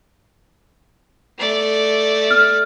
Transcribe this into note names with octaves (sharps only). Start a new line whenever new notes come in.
A3 D5
F6